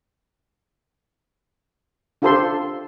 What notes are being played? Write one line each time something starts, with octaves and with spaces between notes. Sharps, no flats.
D4 F4 G4 A4 C5 C6